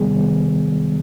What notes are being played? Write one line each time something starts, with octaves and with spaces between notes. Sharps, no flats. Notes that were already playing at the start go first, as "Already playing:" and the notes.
Already playing: E2 C3 D#3 G3 B3 G#4